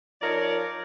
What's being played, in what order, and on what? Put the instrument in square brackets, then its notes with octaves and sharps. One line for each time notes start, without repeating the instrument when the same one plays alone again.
[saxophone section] F3 D#4 A#4 C#5 D5